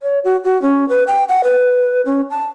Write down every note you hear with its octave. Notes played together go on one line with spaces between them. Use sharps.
C#5
F#4
F#4
C#4
B4
G5
F#5
B4
C#4
A5